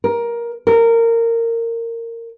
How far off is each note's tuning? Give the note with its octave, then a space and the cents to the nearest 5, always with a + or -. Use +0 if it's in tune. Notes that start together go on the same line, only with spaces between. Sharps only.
A#4 +15
A#4 -20